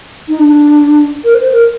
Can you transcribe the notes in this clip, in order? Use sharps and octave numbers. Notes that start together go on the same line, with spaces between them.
D#4
D4
A#4
C5
A#4